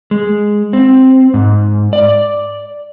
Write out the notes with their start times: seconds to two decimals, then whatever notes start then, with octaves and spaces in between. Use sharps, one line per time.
0.11 G#3
0.73 C4
1.34 G#2
1.93 D5